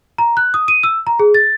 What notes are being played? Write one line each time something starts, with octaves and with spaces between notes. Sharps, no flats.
A#5
F#6
D#6
D#7
E6
A#5
G#4
A6